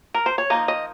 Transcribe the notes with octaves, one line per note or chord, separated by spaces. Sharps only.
A#4
C5
C#5
F3 A#3 D#4 D#5
D#5